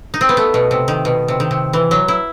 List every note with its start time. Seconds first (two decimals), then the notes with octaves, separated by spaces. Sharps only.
0.14 D#4
0.21 C4
0.29 B3
0.37 A3
0.54 B2
0.71 C3
0.88 D#3
1.05 B2
1.28 C3
1.40 D#3
1.51 C3
1.73 E3
1.91 F#3
2.08 E4